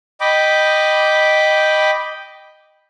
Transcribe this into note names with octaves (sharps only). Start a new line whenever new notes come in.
D#5 G5 B5 D6